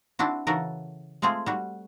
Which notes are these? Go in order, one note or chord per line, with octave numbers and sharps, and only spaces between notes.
C4 D4 E4 F#4
C#3 E3 F#4 A4 A#4
G#3 A3 C4 F4 G#4
G3 F#4